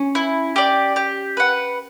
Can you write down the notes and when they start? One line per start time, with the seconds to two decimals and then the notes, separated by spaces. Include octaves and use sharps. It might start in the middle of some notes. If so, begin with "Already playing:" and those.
Already playing: C#4
0.15 E4
0.56 G4 D5
0.96 G4
1.37 B4 F#5